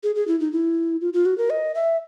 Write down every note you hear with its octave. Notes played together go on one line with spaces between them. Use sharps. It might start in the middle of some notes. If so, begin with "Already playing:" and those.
G#4
G#4
E4
D#4
E4
F4
F4
F#4
A#4
D#5
E5